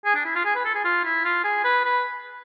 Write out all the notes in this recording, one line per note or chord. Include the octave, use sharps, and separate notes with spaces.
G#4
D4
E4
F4
G#4
B4
A4
G#4
F4
E4
F4
G#4
B4
B4